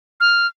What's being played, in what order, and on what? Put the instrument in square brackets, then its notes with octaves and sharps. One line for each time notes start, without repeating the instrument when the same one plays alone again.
[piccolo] F6